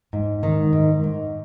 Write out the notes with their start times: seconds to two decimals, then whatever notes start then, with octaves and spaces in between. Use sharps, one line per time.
0.13 G#2
0.43 D#3
0.73 G#2
1.03 G#2